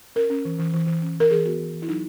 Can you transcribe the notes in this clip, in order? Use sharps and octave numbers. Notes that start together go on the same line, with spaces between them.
C#4 A#4
C#4
E3
E3
E3
E3
C#4
E3 A#4
E3 G#4
B3 F#4
E3
E3
E4
F#3 D#4